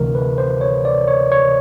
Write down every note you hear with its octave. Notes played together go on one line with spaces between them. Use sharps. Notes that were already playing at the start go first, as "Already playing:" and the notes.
Already playing: D2 C3 E3 A#4
B4
C5
C#5
D5
C#5
C#5